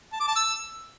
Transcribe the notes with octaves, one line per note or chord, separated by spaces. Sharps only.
A5
D6
A5
E6